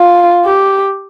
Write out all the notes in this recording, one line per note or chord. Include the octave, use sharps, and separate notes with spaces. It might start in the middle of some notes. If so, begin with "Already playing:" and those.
Already playing: F4
G4